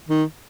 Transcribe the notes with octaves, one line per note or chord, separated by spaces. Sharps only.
D#3